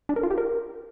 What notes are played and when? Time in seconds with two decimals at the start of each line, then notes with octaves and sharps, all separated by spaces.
0.09 D4
0.16 A#4
0.23 F4
0.30 G4
0.38 A#4